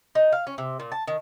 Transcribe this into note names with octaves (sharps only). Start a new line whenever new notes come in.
D#4
F5
C#4
C3
A#2
A5
D#3